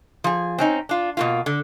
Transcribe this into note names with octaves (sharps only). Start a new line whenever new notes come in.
F3 G#4
C4 C#4 D#4
D4 F4
B2 A#3 F4
D3